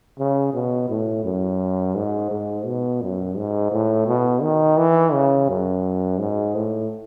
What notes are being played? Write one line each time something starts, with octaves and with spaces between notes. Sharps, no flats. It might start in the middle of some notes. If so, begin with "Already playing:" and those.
C#3
B2
A2
F#2
G#2
G#2
B2
F#2
G#2
A2
B2
D#3
E3
C#3
F#2
G#2
A2